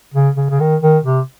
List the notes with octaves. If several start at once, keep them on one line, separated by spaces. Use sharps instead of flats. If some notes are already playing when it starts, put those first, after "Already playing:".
C#3
C#3
C#3
D#3
D#3
C3